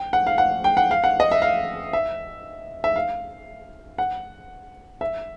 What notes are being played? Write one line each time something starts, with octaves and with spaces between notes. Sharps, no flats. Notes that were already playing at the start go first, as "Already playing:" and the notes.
Already playing: G5
F#5
F5
F#5
G5
F#5
F5
F#5
D#5
E5
F5
E5
E5
F5
F#5
E5